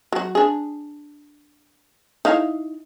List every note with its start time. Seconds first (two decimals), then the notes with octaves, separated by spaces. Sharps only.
0.12 F#3 F#4
0.35 D4 G#4
2.25 D#4 E4 F5